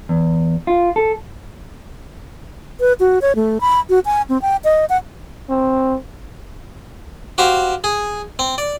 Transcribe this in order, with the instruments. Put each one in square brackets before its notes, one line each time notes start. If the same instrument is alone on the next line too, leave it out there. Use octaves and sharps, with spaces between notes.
[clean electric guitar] E2
F4
A4
[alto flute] B4
F#4
C#5
A3
B5
F#4
G#5
C4
G5
D#5
F#5
[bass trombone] C4
[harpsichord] F#4 G4 C5 F5
G#4
C4
D5